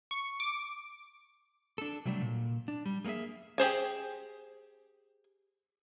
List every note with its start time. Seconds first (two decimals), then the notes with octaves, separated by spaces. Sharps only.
0.11 C#6
0.40 D6
1.78 D4 A4
2.05 C3 F#3 G3 A3 D4
2.22 A#2
2.68 D4
2.86 G3
3.05 G#3 A#3 D#4 G#4 E5
3.58 G4 G#4 C5 G#5